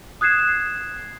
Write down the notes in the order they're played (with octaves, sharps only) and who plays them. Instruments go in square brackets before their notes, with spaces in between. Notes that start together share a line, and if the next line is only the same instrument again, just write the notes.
[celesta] D#6 F#6 G#6 C7 E7